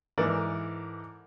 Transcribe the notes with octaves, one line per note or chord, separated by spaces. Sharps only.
G#2 E3 A4 A#4 D5